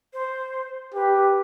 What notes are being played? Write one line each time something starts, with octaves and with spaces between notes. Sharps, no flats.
C5
G4 B4